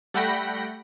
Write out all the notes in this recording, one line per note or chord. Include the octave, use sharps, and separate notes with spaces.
G3 A3 F#5 G5 B5 A#6